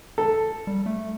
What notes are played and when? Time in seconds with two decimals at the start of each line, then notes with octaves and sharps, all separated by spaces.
0.18 A4
0.67 G3
0.86 A3